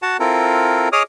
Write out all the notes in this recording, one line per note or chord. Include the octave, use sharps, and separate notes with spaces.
F#4 F#5 A5
C4 E4 F4 A4 A#4
G#4 C#5 D#5 D6 D#6 F6